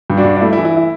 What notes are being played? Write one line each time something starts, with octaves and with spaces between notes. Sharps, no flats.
G2
D4 F#4
G2
D4
A3 E4
E4
E3
E4
E4